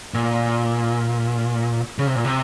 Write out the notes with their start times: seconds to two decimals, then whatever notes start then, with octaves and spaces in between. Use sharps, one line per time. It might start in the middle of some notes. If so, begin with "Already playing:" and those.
0.14 A#2
1.98 C#3
2.07 C3
2.16 A#2
2.25 C3